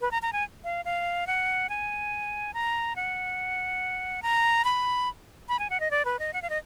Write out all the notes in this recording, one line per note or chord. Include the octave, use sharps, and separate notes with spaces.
B4
A#5
A#5
G#5
F5
F5
F#5
G#5
A#5
F#5
A#5
B5
B5
G#5
F#5
D#5
D5
B4
D#5
F#5
F5
D#5